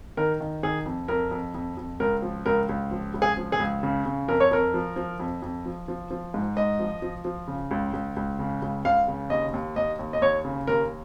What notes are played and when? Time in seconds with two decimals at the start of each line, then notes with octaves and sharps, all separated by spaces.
0.17 D#3 A#4
0.40 D#3
0.63 D#3 G#4
0.86 F2
1.08 F2 A#4
1.31 F2
1.55 F2
1.77 F2
2.00 C#2 A#4
2.22 F3
2.46 C#2 A#4
2.69 C#2
2.91 F3
3.14 C#2
3.22 G#4
3.37 F3
3.52 G#4
3.60 C#2
3.83 C#3
4.06 C#3
4.28 F2 A#4
4.40 C#5
4.51 F2 A#4
4.74 F3
4.96 F3
5.20 F2
5.42 F2
5.66 F3
5.88 F3
6.11 F3
6.34 G#2
6.57 G#2 D#5
6.79 F3
7.02 F3
7.25 F3
7.48 C#3
7.71 C#2
7.93 C#2
8.16 C#2
8.39 C#3
8.62 C#2
8.85 C#2 F5
9.08 C#3
9.30 D#2 D#5
9.54 D#2
9.76 D#2 D#5
9.99 D#2
10.13 D#5
10.21 D#2 C#5
10.45 C#3
10.67 D#2 A#4